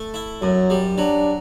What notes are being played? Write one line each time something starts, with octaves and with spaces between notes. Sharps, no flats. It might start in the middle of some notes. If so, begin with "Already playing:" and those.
Already playing: A3
E4
F#2 F#3
G3
F#3 D4